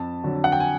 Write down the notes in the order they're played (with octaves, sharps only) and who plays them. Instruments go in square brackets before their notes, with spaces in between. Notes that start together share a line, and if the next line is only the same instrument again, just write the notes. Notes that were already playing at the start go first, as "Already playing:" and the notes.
Already playing: [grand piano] F2 A5
D3 F#3
F#5
G5
G#5